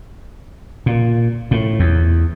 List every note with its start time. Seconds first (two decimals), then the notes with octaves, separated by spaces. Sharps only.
0.86 A#2
1.51 A2
1.80 E2